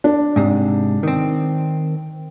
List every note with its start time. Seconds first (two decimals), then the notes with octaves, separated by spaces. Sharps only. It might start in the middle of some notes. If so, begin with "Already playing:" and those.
0.04 D4
0.36 G#2 C3
1.03 D#3 C4